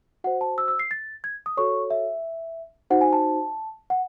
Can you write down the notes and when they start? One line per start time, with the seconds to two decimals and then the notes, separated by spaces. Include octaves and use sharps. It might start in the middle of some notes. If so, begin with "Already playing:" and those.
0.24 F#4 C5 F#5
0.41 A5
0.58 E6
0.68 E6
0.79 C7
0.91 A6
1.24 G#6
1.46 D#6
1.57 F#4 A4 C#5 C#6
1.90 E5
2.90 D#4 F#4 C5 F#5
3.01 G#5
3.13 A5
3.90 F#5